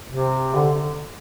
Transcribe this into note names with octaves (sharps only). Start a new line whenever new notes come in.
C3
D3